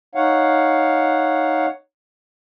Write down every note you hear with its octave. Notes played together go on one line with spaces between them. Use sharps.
D#4 C#5 F5 F#5